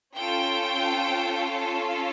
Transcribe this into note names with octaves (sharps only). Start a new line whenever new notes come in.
C#4 F4 A4 G5